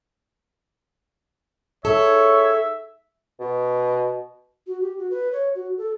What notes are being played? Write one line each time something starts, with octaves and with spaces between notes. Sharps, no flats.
D#4 G#4 A4 C#5 E5
B2
F#4
G4
F#4
B4
C#5
F#4
A4